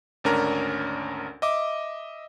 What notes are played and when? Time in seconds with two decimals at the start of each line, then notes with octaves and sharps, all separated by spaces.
0.24 G#1 D2 C#4 D4 A#4 A#5
1.42 D#5 E5 D6